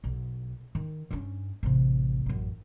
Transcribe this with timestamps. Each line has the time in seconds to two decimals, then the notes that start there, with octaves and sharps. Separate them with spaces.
0.04 B1
0.75 D#3
1.11 G2 C#4
1.63 A1 C3
2.26 A1 F#2